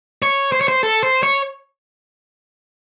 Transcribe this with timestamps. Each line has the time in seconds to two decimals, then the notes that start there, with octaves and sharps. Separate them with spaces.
0.22 C#5
0.52 C5
0.61 C#5
0.68 C5
0.83 A4
1.03 C5
1.23 C#5